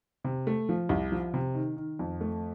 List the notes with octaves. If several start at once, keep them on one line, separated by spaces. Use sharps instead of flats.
C3
A3
F3
C2
F3
C3
D#3
D#3
F2
A3